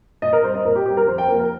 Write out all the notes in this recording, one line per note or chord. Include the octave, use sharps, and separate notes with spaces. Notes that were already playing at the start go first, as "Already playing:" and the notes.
A#2 D#5
A#4
G3 C4 C5
D#5
A#2 A#4
G4
G3 C4 G4
A#4
F2 C5
G5
F3 A#3 A#4
A#4